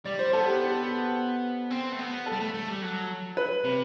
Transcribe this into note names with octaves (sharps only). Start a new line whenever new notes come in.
G3 D5
C5
B3 A4
G4
G4
C4
A3
B3
A4
G3
A3
A3
G3
F#3
B4
C3